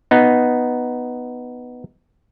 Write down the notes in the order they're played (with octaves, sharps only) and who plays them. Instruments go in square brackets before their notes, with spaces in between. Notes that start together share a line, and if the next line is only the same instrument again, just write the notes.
[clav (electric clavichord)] B3 D#4